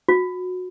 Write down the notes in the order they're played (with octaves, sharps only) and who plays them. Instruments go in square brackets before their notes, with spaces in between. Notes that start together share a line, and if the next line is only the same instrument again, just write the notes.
[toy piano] F#4